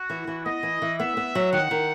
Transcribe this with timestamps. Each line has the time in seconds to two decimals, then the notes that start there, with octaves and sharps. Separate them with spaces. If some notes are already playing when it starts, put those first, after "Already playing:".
Already playing: F#4
0.10 E3
0.27 E3
0.45 B3 D#5
0.63 E3
0.82 E3
0.99 B3 E5
1.17 B3
1.35 F#3
1.52 D#3 F#5
1.71 D#3